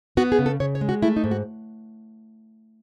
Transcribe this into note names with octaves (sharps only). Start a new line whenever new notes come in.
B3 F#4
G#4
C#3
A4
C#3 C#5
C#5
G#3
F#4
A3 E4
D#4
G#2
F#4